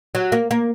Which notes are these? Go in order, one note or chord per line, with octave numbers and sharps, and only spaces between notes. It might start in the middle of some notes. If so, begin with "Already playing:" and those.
F#3
A#3
A#3